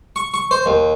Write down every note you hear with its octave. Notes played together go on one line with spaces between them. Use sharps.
C#6
C#6
C5
D#2